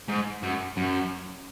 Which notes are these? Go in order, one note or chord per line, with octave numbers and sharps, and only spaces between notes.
G#2
F#2
F#2